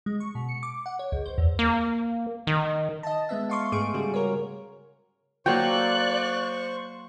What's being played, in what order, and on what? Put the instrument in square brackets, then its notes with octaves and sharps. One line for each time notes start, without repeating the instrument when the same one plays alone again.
[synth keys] G#3
C#6
B2
C#7
D6
F#5
C#5
C#2
C5
E2
[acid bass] A#3
D#3
[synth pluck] D#5 A5
G#3 B3 E5
F5 C6 C#6
G#2 A3 G#4 C#6 D7
C#3 G3 F#4 G#4
A#4 C#5
[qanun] F#3 A#3 A4 [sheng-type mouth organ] C5 C#6 [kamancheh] D5 F#6 [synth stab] G5